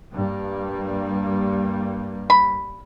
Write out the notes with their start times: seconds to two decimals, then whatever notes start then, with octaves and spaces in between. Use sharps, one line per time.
0.12 G2 G3 A#3
2.30 B5